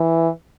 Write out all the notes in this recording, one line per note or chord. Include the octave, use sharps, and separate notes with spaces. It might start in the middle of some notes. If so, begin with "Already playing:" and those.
Already playing: E3